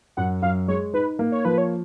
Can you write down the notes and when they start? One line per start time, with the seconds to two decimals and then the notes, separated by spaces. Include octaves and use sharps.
0.17 F#2 F#5
0.42 F#2 F5
0.68 G#3 C#5
0.93 D#4 B4
1.19 A#3
1.32 C#5
1.45 F3 B4
1.58 C#5